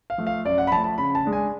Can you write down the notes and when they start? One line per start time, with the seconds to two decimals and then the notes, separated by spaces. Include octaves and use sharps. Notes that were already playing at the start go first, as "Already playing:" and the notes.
0.10 F5
0.18 F3 A3
0.27 F5
0.45 F#2 D5
0.58 F#5
0.67 B5
0.72 F3 A5
0.76 A3
0.84 A5
0.98 C#3 B5
1.15 A5
1.25 G#3 D4
1.33 G#5